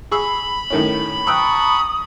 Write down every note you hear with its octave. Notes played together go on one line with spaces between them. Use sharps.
G#4 B5 C#6 E6
A2 D#3 C#4
G5 A5 A#5 C#6 D#6 E6 F#6